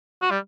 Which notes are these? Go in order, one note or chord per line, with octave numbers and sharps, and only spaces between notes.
F#4
G3